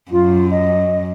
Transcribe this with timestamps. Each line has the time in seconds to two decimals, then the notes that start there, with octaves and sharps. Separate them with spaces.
0.11 F#2 F4
0.51 D#5